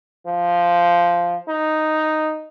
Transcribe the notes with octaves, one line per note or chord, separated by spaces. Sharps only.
F3
D#4